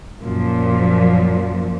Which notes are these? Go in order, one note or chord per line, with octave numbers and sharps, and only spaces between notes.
F#2 A#2 F3